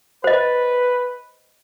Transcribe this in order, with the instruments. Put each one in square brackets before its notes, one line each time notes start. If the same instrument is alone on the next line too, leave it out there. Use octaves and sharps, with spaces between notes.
[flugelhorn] B4 [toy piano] C5 D#5